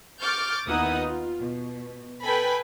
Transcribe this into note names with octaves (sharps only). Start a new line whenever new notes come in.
C#6 D6 F6 G6 A6
D#2 B3 D#4 E4 F#5 D#6
F4
B2
A4 B4 G5 G#5 B5